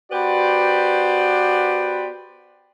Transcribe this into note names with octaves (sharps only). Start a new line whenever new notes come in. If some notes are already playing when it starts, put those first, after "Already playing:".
B3 F#4 G4 B4 C5 D5